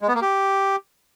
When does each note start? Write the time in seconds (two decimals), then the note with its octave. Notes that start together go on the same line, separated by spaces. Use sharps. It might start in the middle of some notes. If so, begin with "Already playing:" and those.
0.02 G#3
0.08 B3
0.15 A#3
0.22 G4